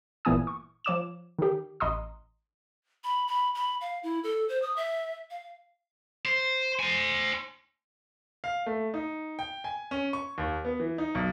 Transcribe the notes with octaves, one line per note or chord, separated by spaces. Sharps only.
G1 A#2 E3 B3 G#5 D#6
C#6
F3 C#5 D6 E7
D#3 G4
A1 D#5 A#5 C6 D#6
B5
B5
B5
F5
E4
A4
C5
D#6
E5
F5
C5
C5 G#5
F5
A3
D#4
G5
G#5
C#4
C#6
D#2
B3
E3
D#4
B1